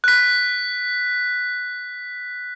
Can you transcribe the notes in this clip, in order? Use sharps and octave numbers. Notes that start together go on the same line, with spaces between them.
F#6 B6